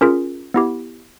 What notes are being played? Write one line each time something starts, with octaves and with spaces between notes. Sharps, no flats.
C#4 F4 G#4 A#4
B3 E4 G4